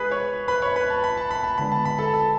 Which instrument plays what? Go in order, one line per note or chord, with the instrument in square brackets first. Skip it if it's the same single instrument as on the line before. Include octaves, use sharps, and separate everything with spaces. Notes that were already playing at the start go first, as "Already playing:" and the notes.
Already playing: [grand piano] G#3 D4 G#4 B4 B5
C#5 C#6
B4 B5
C#5 C#6
B4 B5
A5
B5
A5
B5
A5
D3 G#3 B3 D4 B5
A5
B5
A4 A5
A4 A5